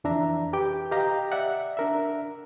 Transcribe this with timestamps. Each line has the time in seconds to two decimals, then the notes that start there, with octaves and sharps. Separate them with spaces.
0.04 F2 E3 D4 E5 A#5
0.53 G4 B4 G5 D6
0.92 G4 D#5 F5 A#5
1.32 D5 E5 F#5
1.77 D4 A#4 E5